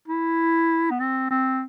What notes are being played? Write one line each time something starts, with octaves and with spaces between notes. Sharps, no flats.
E4
B3
C4
C4